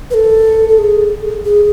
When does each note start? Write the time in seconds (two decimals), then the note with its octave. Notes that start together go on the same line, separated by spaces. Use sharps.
0.11 B4
0.14 A4
0.69 A4
0.78 G#4
1.45 G#4